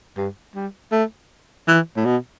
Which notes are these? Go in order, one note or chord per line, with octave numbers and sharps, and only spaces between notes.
G2
G3
A3
E3
A2
B2